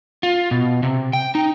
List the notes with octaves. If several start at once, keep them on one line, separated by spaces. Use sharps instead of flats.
F4
B2
C3
G5
D#4